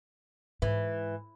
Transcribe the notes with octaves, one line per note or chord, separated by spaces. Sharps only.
G#2 E3